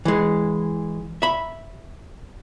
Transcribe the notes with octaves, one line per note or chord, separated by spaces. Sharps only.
E3 G#3
E5 B5